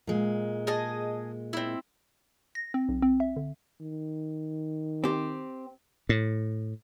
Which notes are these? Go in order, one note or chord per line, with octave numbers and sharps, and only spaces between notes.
A#2 G#3
G#4 D#5 A5
C4 E4
A#6
C4
B1
C4
E5
D3
D#3
C4 G4
A2